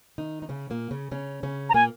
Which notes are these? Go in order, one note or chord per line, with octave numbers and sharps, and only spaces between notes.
D#3 D#4
D#4
C#3 C#4
A#2 A#3
C#3 C#4
C#3 C#4
C#3 C#4
A#5
A#2 A#3 G#5